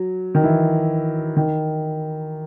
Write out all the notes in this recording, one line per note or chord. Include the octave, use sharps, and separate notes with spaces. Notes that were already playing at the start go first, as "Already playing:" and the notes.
Already playing: F#3
D#3
E3
D#3